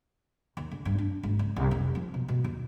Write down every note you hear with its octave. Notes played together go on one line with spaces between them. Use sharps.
D#2
D3
G2
D4
G#1
C#2
C2
F1
F3
B2
B2
D#2